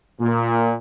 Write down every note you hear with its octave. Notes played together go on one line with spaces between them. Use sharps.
A#2